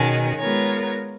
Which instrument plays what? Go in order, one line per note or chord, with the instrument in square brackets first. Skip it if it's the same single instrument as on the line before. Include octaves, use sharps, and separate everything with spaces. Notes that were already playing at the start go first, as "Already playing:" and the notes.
Already playing: [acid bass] B2 [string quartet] D#3 G#3 C#4
[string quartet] G#3 B3 F4 A#4 C#5